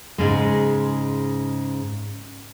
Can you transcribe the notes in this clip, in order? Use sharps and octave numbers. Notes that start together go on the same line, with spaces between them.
G#2 C#3 G#3